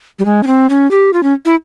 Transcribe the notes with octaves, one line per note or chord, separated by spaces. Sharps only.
G3
G#3
C#4
C4
C#4
G4
F4
C#4
E4